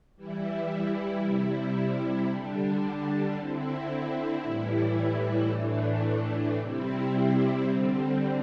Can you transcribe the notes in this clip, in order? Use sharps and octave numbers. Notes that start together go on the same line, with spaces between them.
E3 G3 E4
C3 G3 E4
D3 G3 D4
D3 C4 E4
A2 E3 G3 E4
A2 E3 A3 D4
C3 G3 C4 E4
D3 G3 C4